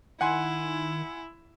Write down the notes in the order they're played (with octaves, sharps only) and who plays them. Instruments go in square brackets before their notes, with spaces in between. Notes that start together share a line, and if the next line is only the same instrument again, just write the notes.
[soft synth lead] D#3 [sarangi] E4 [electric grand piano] F#5 G#5 C6